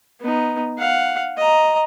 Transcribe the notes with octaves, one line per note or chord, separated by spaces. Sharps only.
B3 D#4
F5 F#5
D#5 A#5